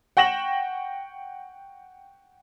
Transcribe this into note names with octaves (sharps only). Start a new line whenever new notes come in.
F#5 G5 C#6 A#6 E7 F#7